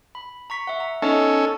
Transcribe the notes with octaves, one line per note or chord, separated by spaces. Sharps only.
B5
A#5 C#6 B6
E5 F#5
A#5
B3 C#4 D#4 A4 D#5